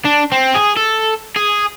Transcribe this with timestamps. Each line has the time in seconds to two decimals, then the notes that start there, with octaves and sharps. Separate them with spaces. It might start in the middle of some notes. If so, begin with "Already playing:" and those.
0.05 D4
0.32 C4
0.55 G#4
0.77 A4
1.36 G#4